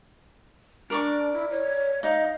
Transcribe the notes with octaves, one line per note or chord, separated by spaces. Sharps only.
D4 A#4 D5 C#6
E4
C#5
D#4 D#5 F5